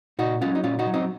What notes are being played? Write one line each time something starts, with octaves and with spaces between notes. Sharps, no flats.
A#2 D#4 F#4
F#3 C#4 F4
D#4
A#2 C#4 F4
D#4 F#4
F#3
C4 D#4